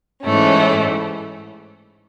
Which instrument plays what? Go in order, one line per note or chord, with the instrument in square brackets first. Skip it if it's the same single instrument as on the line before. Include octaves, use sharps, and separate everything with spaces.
[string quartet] G#2 E3 A3 C#4